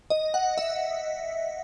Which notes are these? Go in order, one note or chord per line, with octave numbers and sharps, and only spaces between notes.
D#5
F#5
E5